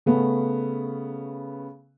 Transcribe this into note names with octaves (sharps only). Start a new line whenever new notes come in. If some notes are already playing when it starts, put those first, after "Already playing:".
C#3 A3 B3 C#4